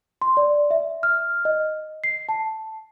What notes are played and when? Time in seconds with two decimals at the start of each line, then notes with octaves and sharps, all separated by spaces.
0.22 C6
0.37 D5
0.71 E5
1.03 F6
1.45 D#5
2.04 C7
2.29 A5